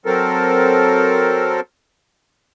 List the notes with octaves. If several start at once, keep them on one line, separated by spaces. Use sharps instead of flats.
F#3 C4 A4 A#4